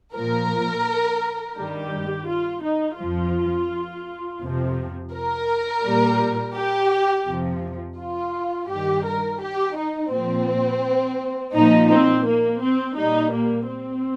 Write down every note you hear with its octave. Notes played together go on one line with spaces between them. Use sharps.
A#2 F3 A#4
G2 D#3 G3 G4
F4
D#4
F2 F3 F4
F2 C3 F3
A#4
A#2 G3
G4
F2 C3 F3
F4
G2 D#3 G3 G4
A#4
G4
D#4
A#2 F3 C4
A#2 F3 D#4
C4
A#3
C4
A#2 G3 D#4
A#3
C4